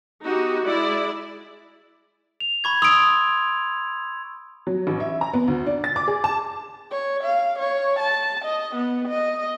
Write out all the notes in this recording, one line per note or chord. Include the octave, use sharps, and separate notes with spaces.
B3 D#4 F#4 G4
G#3 E4 D5
F7
B5 C#6 G#6
C6 D#6 E6 D7 F7
F#3
A1
E5
A#5
B3
D2
D4
A6
D6
G#4
A5
C#5
F5
C#5
A5
D#5
B3
D#5